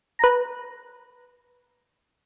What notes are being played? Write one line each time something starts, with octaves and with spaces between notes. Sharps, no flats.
B4 A#5